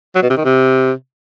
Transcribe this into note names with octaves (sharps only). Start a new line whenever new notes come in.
F#3
B2
C3
D#3
C3